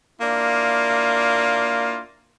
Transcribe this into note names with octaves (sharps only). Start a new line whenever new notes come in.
A#3 D4 E4 F4